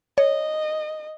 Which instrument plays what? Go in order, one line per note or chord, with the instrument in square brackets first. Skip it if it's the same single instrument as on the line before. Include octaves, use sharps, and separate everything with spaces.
[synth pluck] C#5 [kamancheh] D#5